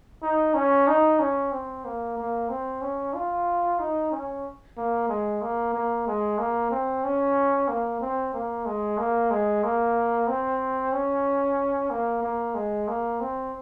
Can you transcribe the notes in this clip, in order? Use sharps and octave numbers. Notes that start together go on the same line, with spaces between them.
D#4
C#4
D#4
C#4
C4
A#3
A#3
C4
C#4
F4
D#4
C#4
A#3
G#3
A#3
A#3
G#3
A#3
C4
C#4
A#3
C4
A#3
G#3
A#3
G#3
A#3
C4
C#4
A#3
A#3
G#3
A#3
C4